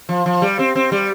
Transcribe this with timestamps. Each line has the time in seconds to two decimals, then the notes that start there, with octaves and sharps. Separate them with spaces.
0.09 F3
0.26 F3
0.42 G3
0.59 C4
0.76 C4
0.92 G3